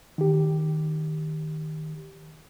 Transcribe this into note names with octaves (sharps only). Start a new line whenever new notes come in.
D#3 G4